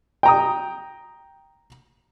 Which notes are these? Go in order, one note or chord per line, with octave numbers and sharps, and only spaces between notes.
G5 A#5 D#6